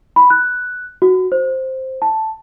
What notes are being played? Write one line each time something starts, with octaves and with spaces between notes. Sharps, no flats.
B5
F#6
F#4
C5
A5